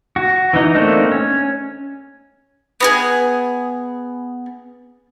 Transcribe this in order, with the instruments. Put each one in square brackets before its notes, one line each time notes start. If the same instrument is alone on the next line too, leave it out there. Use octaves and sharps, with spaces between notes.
[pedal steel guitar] F#4
E3 D#4
A3 A#3 C4 D4 D#4
C#4
[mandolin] B3 F#4 G#4